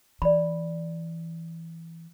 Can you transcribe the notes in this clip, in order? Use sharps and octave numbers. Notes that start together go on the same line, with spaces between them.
E3 D5 B5